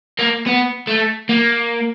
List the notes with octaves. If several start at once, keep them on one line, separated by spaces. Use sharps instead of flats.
A#3
B3
A3
A#3